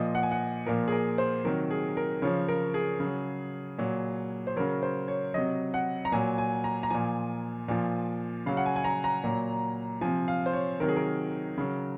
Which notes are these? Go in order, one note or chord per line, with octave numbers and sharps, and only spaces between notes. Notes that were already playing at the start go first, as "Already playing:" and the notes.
Already playing: A#2 F3 D#5
F#5
G#5
F#5
A#2 F3 A#4
G#4
A#4
C5
C3 D#3 F#3 A#4
G#4
A#4
C#3 F3 C#5
A#4
G#4
C#3 F#3
A#2 F#3
C5
C#3 F#3 A#4
C5
C#5
C3 F#3 D#5
F#5
A#5
A#2 F#3 G#5
G#5
A#5
A#5
A#2 F3 G#5
A#2 F3
C#3 F#3 F5
F#5
G#5
G#5
A#5
A#5
A#2 F#3
C3 F3 G#5
F5
C5
C#5
C3 D#3 F#3 A#4
G#4
A#4
C#3 F#3